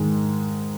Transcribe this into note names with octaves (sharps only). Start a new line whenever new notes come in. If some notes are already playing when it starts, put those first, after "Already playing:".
Already playing: G#2 D#3 G#3